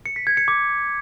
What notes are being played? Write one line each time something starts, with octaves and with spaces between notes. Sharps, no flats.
C#7
B6
G#6
C#7
D6